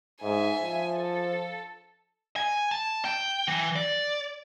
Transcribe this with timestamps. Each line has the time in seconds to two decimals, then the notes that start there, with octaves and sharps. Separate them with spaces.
0.22 G#2 E5 G#5
0.62 F3
0.94 A4
2.36 G#5
2.71 A5
3.05 G5
3.48 E3
3.76 D5